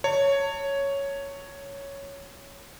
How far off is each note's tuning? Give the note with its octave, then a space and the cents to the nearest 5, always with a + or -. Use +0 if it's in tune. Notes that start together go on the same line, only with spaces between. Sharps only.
C#5 +0 A5 +40